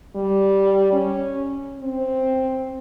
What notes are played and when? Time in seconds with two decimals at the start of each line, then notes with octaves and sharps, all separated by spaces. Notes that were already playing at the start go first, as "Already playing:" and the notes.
0.15 G3
0.93 C#4
1.81 C4